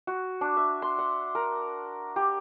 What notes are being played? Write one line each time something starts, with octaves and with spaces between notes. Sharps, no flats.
F#4
D4
E5
C6
F#5
A#4
G4